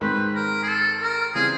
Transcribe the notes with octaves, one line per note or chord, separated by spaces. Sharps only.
G#2 D#3 G#3 C4 B4
A#4
G#4
A4
A#4
C#3 E3 G3 C4 G#4